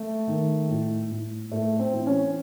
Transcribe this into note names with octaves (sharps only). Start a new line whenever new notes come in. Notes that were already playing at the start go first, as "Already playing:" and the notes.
Already playing: A3
D#3
A2
A2
A2 A3
C4
E3
C#4